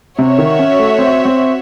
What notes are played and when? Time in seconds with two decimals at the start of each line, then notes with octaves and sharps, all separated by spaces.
0.18 C3 F#4 C#5 E5
0.38 D#3
0.59 C#4
0.79 A3
0.99 C4
1.25 C4